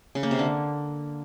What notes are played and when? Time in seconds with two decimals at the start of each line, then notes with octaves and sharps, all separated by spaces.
0.15 C#3
0.23 A#3
0.31 C3
0.39 D3